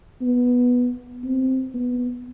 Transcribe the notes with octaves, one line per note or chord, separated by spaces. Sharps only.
B3
C4
B3